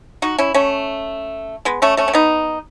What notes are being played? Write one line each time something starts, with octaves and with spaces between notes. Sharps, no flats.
D#4 F#4
C#4 E4
A3 C#4
G#3 B3
A3 C#4
A3 C#4
C#4
B3 D#4